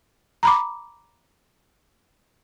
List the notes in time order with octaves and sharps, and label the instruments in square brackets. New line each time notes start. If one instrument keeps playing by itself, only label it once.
[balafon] A#5 B5 D6